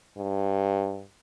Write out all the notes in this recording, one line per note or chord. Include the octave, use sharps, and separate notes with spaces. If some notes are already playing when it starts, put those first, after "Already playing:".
G2